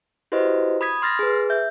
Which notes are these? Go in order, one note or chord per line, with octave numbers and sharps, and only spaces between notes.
E4 F#4 G4 B4 C5 D#5
B5 D#6 G#6 B6
C6 F6 A6 A#6
G#4 B4
E5 G6